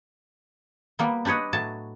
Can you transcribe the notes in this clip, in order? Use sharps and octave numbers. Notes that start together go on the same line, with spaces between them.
G3 A#3 B3
D4 G4 B4 C#5 D#5
A2 F#3 A5